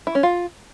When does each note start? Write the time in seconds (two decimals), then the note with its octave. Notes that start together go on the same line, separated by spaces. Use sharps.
0.07 E4
0.15 C#4
0.23 F4